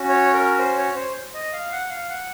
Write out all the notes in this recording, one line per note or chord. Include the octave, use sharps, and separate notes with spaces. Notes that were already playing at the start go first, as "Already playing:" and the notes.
Already playing: C#4 F#4
C#5
A#4
C5
C#5
C5
D#5
F5
F#5
F5
F#5